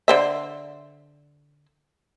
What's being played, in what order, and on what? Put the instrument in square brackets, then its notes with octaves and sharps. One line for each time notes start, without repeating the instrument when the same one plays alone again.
[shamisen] D3 C5 E5